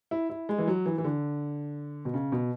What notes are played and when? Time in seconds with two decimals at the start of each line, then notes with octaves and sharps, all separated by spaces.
0.11 E4
0.30 E4
0.49 G#3
0.58 E3
0.68 F#3
0.86 E3
0.98 E3
1.04 D3
2.05 B2
2.14 C#3
2.32 B2